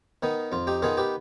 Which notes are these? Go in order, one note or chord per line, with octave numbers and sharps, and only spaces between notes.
D#3 B3 D#4
F2 F4
D#4 G4
D#3 B3 D#4 F4 G#4
G4 B4